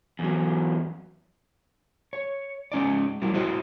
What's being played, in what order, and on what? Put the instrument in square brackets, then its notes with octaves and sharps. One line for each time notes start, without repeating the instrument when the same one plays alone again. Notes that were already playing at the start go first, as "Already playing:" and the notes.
[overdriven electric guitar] E2 F#3
[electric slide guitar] C#5
G#3 C#4 D#4 D5
F#3 G3 E4 A#4
E4 F#4 C5 D#5